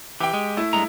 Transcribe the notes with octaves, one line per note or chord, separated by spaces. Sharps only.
E3 G4 G5
G#3
A3 E4
G2 G#3 A#5